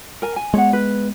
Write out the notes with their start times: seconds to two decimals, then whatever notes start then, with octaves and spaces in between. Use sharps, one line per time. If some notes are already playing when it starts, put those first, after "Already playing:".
0.22 A#4 G#5
0.36 G#5
0.54 G#3 B3 C#5 F#5
0.73 B4